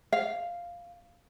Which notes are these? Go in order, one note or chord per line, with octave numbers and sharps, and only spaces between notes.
F5